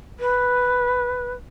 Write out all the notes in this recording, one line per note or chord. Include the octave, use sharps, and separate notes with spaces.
B4